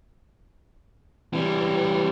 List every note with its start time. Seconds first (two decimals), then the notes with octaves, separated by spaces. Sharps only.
1.33 E3 G3